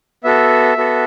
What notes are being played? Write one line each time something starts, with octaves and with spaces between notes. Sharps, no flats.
B3 F#4 A4 E5
B3 F#4 A4